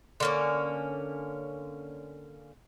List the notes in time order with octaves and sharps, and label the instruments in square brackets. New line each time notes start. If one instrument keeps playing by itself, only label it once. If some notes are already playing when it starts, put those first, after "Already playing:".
[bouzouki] D3 A#3 C#4